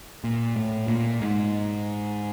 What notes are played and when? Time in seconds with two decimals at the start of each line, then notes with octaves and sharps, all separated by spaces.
0.24 A#2
0.56 A2
0.88 A#2
1.22 G#2